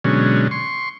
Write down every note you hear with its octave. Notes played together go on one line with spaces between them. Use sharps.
B2 D3 F#3 G#3 C#4
C6 C#6